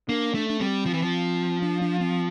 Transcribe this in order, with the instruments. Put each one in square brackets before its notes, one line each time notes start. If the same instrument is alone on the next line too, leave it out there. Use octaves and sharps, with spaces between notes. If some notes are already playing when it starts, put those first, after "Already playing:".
[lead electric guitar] A#3 [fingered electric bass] D4
[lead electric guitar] A3 [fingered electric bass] D4
[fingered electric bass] D4
[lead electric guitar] G3 [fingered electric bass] C4
[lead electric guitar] F3
E3
F3
[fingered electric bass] D4
D4
C4